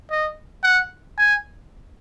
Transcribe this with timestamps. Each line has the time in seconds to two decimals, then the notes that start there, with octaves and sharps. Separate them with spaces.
0.11 D#5
0.64 F#5
1.19 G#5